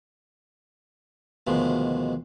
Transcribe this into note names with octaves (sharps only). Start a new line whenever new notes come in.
D2 B2 D#3 F3 G#3